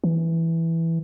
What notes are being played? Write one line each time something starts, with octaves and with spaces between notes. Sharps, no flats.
E3